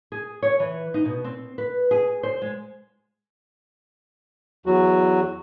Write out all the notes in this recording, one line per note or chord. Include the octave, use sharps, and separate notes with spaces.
G#4
C#5
E3
D#4
B2
C4
B4
G#4
C5
G#3
E2 F#3 F#4